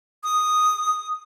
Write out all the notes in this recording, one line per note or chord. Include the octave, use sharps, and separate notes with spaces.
D#6